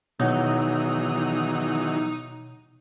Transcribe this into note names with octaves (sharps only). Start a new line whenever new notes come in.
E2 B2 D#3 E3 F#3 D#4 C#5 F#5